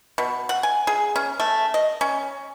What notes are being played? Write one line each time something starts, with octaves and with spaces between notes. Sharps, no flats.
B2
F#5
G#5
G#4
C#4
A3
D#5
C#4